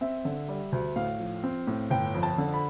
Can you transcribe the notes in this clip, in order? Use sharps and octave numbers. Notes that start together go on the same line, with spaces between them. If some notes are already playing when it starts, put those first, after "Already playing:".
C4 E5
D3
G3
D2
A2 F5
F3
C4
A2
G1 G5
F2
A5
D3
B5